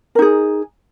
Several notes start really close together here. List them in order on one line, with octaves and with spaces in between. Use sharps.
A#4 D#4 G#4